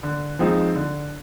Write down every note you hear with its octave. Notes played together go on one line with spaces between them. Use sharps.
D3
F3 G#3 C4 D#4
D3